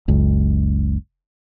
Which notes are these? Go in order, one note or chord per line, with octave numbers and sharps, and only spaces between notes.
F#1 C#2